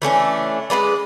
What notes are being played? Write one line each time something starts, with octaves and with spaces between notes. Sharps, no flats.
E3 A3 C#4 D4
G#3 A#3 B4 D5